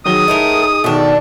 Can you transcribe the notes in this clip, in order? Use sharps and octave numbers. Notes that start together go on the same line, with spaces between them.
D#3 F#3 G#4 D#6 G7
A2 A3 D#4 A#4
B2 D#3 A3 D4